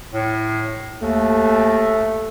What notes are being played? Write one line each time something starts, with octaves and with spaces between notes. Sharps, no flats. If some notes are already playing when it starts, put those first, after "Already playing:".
A2
D#2 A3